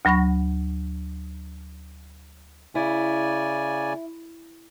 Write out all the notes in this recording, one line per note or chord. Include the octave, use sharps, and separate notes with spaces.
D2 F#3 B5 C#6 A#6
C#3 E4 D5 G#5